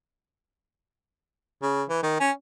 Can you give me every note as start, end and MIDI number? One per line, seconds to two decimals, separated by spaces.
1.62 1.83 49
1.90 2.03 52
2.03 2.17 51
2.20 2.32 61